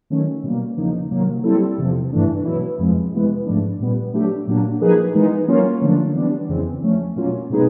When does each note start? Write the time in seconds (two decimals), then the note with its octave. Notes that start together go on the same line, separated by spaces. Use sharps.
0.10 D#3 F#3 A3 C#4
0.43 B2 G3 A#3
0.77 E2 C#3 F3 A#3 D#4
1.11 C3 D#3 F#3 A#3
1.44 G3 C4 E4 A4
1.78 E2 C3 F3
2.12 G2 E3 A3 D4
2.45 B2 F#3 B3 E4
2.79 F2 C3 F3 G#3
3.12 C3 E3 G#3 B3
3.46 G#2 F3 A3 D4
3.80 A#2 G3 B3
4.13 F#3 A3 D4 G4
4.47 A#2 F#3 A#3 D4
4.81 F3 A#3 D#4 G#4 B4
5.15 E3 G#3 B3 D#4
5.48 F#3 A#3 C#4 F4
5.82 D3 F3 A3 D4
6.15 E3 G3 B3 D4
6.49 F2 C#3 E3 G#3 C4
6.83 F3 A3 C#4
7.16 B2 F#3 A#3 C#4 F4
7.50 B2 G#3 B3 D#4 G#4